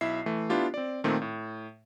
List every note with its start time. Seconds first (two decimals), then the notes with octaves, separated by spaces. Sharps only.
0.01 B1 E4 E5 C7
0.26 E3 A3
0.50 B3 D4 E4 F4 G4
0.74 C4 D5
1.04 A#2 D#3 A3 C4
1.22 A2